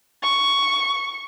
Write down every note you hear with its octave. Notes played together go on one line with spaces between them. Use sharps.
C#6